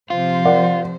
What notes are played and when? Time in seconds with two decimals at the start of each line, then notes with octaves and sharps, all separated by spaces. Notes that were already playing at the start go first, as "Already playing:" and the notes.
0.10 C3 F3 F4 C5
0.45 A#4 D5 F#5